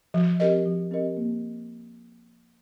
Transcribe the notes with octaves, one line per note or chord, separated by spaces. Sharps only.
F3
C4 G4 A#4 D#5
F3
C4 G4 A#4 D#5
A#3